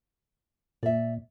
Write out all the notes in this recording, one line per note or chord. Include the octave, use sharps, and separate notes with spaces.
A#2 D5 E5